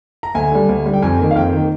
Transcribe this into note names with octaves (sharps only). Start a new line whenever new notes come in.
A#5
D2 G#5
D3 G3
D2
D3 G3
G5
F2 G#5
D#3 A#3
F5
F2 G5
D#3 A#3